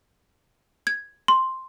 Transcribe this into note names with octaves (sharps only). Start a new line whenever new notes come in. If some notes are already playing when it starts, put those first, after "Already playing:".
G#6
C6